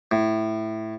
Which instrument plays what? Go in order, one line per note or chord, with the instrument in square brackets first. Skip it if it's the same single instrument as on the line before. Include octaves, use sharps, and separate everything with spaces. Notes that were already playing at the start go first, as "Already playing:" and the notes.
[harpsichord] A2